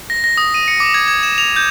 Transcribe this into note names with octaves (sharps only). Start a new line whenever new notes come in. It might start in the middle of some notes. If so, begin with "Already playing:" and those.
A#6
A#6
D#6
D#7
C#7
D6
G#6
G#6
E7
F7
G6